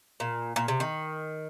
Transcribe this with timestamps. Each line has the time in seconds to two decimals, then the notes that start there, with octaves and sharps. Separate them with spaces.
0.20 A#2
0.56 A#2
0.68 C3
0.80 D#3